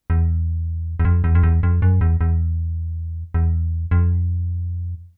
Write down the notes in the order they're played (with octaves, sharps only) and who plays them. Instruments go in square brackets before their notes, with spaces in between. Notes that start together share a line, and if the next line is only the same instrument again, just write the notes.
[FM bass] E2
E2
F2
E2
F2
E2
F2
F#2
E2
E2
E2
F2